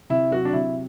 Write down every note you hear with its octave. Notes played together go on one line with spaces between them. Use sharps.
C3 E4
F#3 F#4
D4
C3 E4